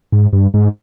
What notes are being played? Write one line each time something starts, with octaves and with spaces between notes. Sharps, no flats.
G#2
G2
G#2